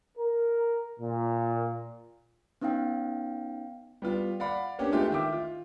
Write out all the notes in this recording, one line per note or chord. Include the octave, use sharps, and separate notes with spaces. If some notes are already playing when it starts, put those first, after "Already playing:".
A#4
A#2
B3 C#4 D#4 F5 G5
G3 B3 F4
D5 F5 F#5 B5
A#3 B3 C#4 D4 G4
G#3 A3 B3 F4 G4
D#3 E5 D6
F4